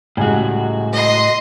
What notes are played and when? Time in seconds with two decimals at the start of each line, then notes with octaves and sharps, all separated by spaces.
0.17 C#2 A2 G3 F#4 G#5
0.93 D#5 C6